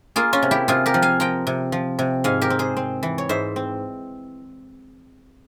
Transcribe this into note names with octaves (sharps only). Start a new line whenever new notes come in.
A#3 F4 G#4
C#4 F4
C3
E4 G4
C3 F4 G#4
G4 A#4
F3
F5 G#5
F3 G5 A#5
C3
F3
C3
G#2 F5 G#5
G4 A#4
C4
G#4 C5
C4
E3
C#5
G#2 C5 E5
C4